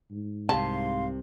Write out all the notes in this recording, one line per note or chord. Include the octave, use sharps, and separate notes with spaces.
G#2
C2 C3 F5 A5 C6